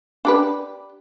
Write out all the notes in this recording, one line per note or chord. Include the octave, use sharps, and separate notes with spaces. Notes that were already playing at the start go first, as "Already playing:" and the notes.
D4 G4 B4